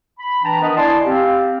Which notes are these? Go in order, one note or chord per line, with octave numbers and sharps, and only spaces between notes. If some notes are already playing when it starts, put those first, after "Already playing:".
B5
E3 D4 G5 A5 A#5
D#3 B3 D4 A#4 B4 D#5
E4 D5 G#5 A5 C6
C4 G4 F5